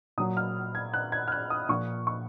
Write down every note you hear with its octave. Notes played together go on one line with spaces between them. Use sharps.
A#2 F#3 D#6
F6
G#6
F#6
G#6
F6
F#6
D#6
A#2 F3 C#6
C#6